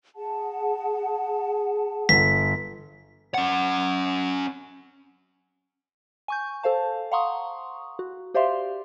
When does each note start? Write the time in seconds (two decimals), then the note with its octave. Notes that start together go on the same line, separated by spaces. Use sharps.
0.16 G#4 F#5 A5
2.09 G1 B6
3.34 C#4 F#5
6.28 G#5 C#6 G6
6.63 A4 C5 F5 A5
7.12 F5 F#5 A#5 C6 C#6 D#6
7.99 F#4
8.34 G4 C5 D5 E5 F5 C6